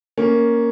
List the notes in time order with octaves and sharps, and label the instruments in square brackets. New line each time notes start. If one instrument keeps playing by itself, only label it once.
[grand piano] A#3 C#4